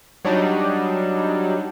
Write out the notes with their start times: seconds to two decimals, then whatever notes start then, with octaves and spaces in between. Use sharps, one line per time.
0.25 F#3 G3 D4 D#4